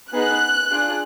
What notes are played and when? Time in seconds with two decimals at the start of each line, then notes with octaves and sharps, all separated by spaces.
0.13 B3 D#4 G#4 F#6
0.71 D4 F4 G#4